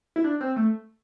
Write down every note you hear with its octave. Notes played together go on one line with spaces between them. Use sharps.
E4
D4
C4
A3